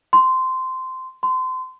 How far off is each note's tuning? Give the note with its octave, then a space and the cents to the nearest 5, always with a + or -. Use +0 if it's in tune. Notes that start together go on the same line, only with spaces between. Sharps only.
C6 -15
C6 -30